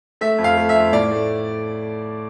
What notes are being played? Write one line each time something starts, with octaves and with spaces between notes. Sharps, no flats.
A3 E5
F2
F5
A3
E5
F2
A2 D5
A3